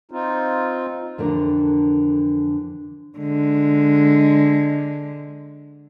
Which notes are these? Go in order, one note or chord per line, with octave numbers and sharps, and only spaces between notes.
C4 D#4 F4
F2 D3 E3 D4 A#4
D3 G#3